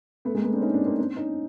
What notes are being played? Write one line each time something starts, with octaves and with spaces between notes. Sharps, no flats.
A3 B3
G#3 A#3
A3 B3
C4 D4
C#4 D#4
C4 D4
A#3 C4
C4 D4
C#4 D#4